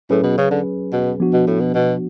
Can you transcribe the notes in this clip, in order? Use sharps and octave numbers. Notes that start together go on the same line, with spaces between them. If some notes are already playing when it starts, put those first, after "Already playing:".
A2 F#3 C#4 G#4 B4
B2
C#3
D3
B2
F3 B3 D4 F#4
B2
A2
B2
B2